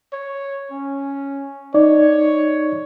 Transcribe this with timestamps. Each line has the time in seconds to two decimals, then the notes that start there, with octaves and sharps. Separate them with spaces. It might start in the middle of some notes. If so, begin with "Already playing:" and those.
0.13 C#5
0.71 C#4
1.74 D#4 C#5 D5